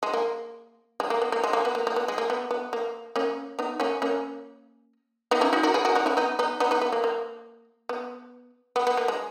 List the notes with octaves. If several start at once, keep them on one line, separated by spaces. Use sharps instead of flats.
G#3
A#3
G#3
A#3
B3
A#3
G#3
A#3
B3
A#3
A#3
B3
G#3
A#3
B3
B3
A#3
A#3 C#4
B3 D#4
A#3 C#4
A#3 C#4
B3 D#4
C#4 E4
D#4 F#4
F#4 A#4
G#4 B4
F#4 A#4
D#4 F#4
C#4 E4
B3 D#4
B3 D#4
B3 D#4
B3 D#4
B3
A#3
A#3
B3
B3
B3
A#3
G#3